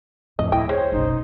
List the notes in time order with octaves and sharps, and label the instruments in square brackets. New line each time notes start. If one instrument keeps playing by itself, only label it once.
[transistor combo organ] F2 A2 [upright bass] D3 [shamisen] D#5
[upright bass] D2 [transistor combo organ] A2 D#5 [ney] E4 [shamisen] G5
[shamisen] G#3 [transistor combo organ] C5 [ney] C#5
[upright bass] F#1 B1 [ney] D#4